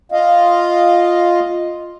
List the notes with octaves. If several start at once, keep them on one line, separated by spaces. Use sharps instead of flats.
F4 D#5 F5